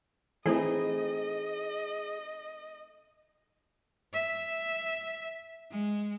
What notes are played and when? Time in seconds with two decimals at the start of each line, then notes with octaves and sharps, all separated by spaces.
0.46 E3 A3 C4 D#4 G#4 D#5
4.13 E5
5.70 G#3